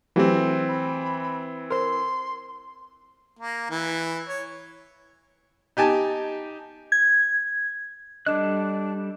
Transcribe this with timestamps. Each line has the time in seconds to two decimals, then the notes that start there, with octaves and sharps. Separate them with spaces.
0.16 E3 F#3 A3 C4 G4
0.68 B5
1.71 A#4 C5 C6
3.39 A#3
3.70 E3
4.29 C#5
5.77 D#4 G4 G#5 A5
6.92 G#6
8.26 G3 D4 A4 D#5 F#6